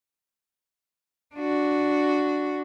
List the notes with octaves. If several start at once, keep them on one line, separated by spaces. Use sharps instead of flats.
D4 F#4